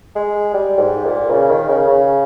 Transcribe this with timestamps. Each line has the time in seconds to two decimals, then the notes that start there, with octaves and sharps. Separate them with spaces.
0.16 G#3
0.54 G3
0.80 G#2
1.05 A#2
1.30 C#3
1.50 D#3
1.69 C#3
1.88 C#3